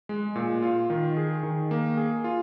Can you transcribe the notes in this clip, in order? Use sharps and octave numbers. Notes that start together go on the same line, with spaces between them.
G#3
A#2
F4
D#3
G#4
D#3
A#3
G#4
F4